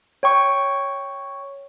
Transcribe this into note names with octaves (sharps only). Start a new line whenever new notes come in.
C#5 G5 C#6